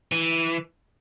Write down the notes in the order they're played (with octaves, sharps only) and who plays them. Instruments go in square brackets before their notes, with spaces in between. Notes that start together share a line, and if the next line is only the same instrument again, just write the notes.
[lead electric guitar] E3